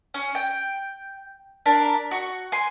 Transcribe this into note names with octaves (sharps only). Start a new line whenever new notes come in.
C#4
G5
D4 A#4 B5
F#4 C#6
G#5 C6